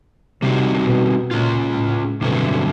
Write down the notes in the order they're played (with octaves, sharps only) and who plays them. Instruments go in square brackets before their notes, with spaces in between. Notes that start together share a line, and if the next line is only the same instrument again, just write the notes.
[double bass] C3 [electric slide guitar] G3 C4 D#4 F#4
[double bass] B2
[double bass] A#2 [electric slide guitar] G#3 C#4 F4
[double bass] A2
[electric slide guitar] G2 D3 F#3 A3 C4 [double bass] B2